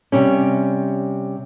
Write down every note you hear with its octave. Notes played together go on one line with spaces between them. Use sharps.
C3 G3 C#4